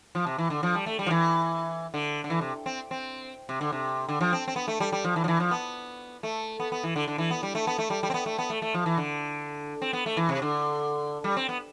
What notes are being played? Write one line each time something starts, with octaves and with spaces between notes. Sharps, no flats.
F3
C3
E3
D3
F3
G3
A3
G3
F3
E3
D3
D3
E3
C3
C4
C4
C3
D3
C3
D3
F3
C4
C4
B3
A3
G3
G3
F3
E3
F3
E3
F3
B3
A3
B3
B3
E3
D3
D3
E3
B3
G3
A3
B3
A3
G3
G3
C4
B3
A3
B3
A3
A3
F3
E3
D3
C4
B3
A3
E3
C3
D3
G3
C4
B3